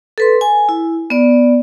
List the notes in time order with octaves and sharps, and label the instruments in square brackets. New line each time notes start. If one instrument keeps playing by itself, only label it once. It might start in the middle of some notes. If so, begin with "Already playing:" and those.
[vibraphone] A4 B4 C6
G#5
E4
B3 D5